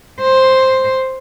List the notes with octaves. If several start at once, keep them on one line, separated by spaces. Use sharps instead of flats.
C5